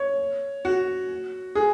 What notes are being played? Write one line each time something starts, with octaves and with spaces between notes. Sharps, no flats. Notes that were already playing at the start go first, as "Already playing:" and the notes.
Already playing: C#5
F#4
G#4